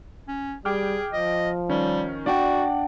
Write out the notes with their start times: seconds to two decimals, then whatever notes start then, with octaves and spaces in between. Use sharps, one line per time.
0.28 C#4
0.65 G3 G#4 G5 D6 F6
1.13 F3 D#5
1.70 D#3 G3 C#4
2.26 D4 F#4 D5 F#5 G5